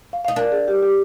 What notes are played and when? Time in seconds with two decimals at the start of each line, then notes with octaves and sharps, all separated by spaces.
0.13 F5
0.25 D#4 F5
0.36 D4 A#4
0.52 G#4
0.68 G4
0.83 G4